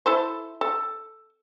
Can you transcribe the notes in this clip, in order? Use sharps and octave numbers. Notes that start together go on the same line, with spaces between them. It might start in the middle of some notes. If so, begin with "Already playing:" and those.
E4 A4 C5
A4